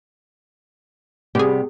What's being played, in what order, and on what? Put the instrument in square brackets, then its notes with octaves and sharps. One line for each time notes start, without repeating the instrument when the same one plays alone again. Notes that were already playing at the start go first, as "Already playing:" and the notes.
[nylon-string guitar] C3 G3 B3 [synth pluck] G4 G#4